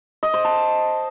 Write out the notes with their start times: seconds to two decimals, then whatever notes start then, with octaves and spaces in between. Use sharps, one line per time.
0.23 D#5
0.34 C5
0.45 A5